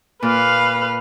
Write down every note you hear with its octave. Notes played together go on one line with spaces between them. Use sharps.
A#2 B4 F5